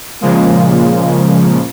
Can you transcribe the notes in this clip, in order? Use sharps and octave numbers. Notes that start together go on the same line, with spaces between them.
A#2 C#3 F3 G#3 A#3